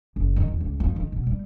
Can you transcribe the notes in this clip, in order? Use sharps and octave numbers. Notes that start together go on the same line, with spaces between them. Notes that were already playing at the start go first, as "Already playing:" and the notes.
F#1
D#3
E2
C#2
F2
D#3
B2
G3